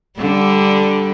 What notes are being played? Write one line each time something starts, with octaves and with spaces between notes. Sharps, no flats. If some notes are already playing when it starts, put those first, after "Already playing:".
D3 G3